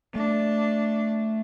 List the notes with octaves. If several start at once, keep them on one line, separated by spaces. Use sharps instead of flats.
A3 D4